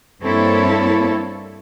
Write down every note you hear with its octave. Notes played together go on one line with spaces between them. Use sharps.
G2 A#3 C4 E4 A4 C#5